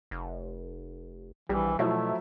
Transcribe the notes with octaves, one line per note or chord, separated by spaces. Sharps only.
F1
A#1 E3 G3
B2 F3 F#3 A3 E4